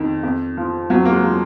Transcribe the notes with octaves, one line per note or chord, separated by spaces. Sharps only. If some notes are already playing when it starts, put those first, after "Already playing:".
Already playing: F2 D#3
F2
F3
F2 F#3
A#3
G#3
F3